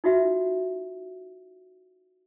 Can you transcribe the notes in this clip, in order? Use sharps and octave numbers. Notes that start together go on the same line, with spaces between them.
D#4 F4 F#4 E5